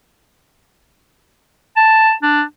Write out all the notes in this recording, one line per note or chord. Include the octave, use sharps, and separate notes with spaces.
A5
D4